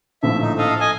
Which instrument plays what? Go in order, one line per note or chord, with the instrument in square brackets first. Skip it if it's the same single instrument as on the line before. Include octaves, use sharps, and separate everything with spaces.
[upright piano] A#1 A2 F3 [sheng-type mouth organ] E5
[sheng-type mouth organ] D#4
A4 D#5 F5
D#5 G#5